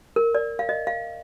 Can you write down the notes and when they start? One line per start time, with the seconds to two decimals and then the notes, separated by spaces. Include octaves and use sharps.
0.16 A#4
0.35 D5
0.59 F5
0.69 D#5
0.87 F5